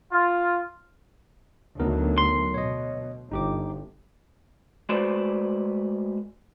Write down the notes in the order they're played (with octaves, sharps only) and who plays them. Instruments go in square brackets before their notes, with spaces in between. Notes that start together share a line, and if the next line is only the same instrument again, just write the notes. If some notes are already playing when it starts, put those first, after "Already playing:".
[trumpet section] F4
[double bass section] D2 F#3 [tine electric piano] B3 D#4 A#4
[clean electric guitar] C6
[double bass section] B2 [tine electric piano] C#5 D#5
[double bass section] G1 [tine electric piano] D#4 G4 D6
[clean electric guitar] G#3 A3 F#4 B4 C5 D5